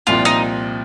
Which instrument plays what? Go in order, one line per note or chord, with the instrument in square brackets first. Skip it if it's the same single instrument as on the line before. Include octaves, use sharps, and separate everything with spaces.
[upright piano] C2 A#2 F3 C4 [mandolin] F4
[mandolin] D#4